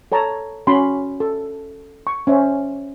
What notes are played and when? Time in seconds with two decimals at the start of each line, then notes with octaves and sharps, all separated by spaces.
0.12 A4 C#5 A5 A#5
0.67 C#4 F#4 B5 C6
1.20 A4
2.07 C#6
2.27 C#4 C5 E5